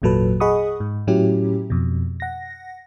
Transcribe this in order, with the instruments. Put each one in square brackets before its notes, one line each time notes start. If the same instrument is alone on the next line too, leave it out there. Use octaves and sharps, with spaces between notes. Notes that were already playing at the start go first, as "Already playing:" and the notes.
[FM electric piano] G#1 E2 A#2 F#3 A4 B4
G#4 D#5 F#5 B5 C#6 D#6
G#2
A2 F#3 C#4 E4 G4
F2 B2
F#5 A#6